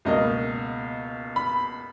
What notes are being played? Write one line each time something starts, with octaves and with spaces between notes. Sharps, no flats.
C#2 B2 A#3 D#5
B5